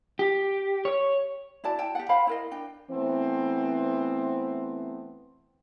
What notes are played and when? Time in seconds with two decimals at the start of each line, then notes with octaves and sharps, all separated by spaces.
0.19 G4
0.85 C#5
1.64 E4 F#4 D5 A5
1.78 E4 G5 A5
1.95 G4 F#5
2.09 C5 F5 G5 B5
2.27 E4 A#4 D#5
2.51 D4 G5
2.91 E3 A3 B3 C4